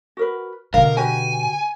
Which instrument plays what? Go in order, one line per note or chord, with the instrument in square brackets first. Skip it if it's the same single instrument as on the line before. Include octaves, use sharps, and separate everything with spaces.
[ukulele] F#4 A#4 B4
[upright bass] B2 D3 [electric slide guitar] A#4 [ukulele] F5
[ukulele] F#4 G4 B4 [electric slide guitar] G#5